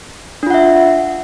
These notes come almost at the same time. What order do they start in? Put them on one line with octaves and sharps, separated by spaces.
D4 F4 F#5 E5